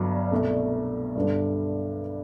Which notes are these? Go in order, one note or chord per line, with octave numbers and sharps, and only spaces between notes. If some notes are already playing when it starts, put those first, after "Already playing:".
Already playing: G1 G2 F#3 B3
C2 B2 A3
G2 D3 G3 B3